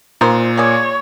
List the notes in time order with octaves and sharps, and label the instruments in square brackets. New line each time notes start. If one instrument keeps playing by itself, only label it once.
[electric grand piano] A#2 [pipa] D#4 A#4 C5
[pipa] A#3 G#4 D5 [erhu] C#5